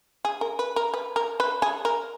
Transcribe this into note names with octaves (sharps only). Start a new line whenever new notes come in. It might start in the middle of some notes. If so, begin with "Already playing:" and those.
G#4
A#4
B4
A#4
B4
A#4
B4
G#4
A#4